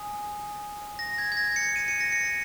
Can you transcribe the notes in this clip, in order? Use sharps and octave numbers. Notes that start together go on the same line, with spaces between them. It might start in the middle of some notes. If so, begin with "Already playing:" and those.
Already playing: G#5 D#6
A#6
G#6
G#6
A#6
C#7
D#7
C#7
A#6
C#7